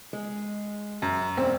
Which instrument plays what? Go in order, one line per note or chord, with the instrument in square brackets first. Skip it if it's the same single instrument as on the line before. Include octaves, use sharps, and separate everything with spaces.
[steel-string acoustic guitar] G#3
[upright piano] F#2
[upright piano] E1 [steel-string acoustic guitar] C4